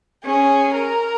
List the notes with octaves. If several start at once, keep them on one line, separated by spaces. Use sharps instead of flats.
C#4 G#4
A#4